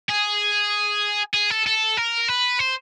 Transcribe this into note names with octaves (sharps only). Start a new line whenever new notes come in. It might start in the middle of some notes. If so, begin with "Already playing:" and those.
G#4
G#4
A4
A4
A#4
B4
C5